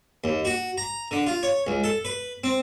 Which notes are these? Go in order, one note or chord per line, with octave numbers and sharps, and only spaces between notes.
D#2
F#4
A#5
D3
F4
C#5
C#2
A4
B4
C4